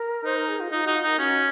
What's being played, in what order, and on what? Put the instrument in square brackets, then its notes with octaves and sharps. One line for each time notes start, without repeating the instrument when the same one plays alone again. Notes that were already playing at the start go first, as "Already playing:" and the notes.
Already playing: [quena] A#4
[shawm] D#4 [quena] C5
[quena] A#4
G#4
F4
[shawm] D#4 [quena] F4
[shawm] D#4 [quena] F#4
[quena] F4
[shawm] D#4 [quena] A#4
[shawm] C#4 [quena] F#4